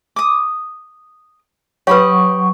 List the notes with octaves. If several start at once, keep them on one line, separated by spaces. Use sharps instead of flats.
D6 D#6
F#3 G4 B4 C#5 F#5 B5 C#6 D#6